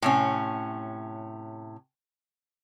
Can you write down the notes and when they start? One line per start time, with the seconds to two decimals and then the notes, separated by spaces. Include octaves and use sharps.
0.02 A2 C3 C#4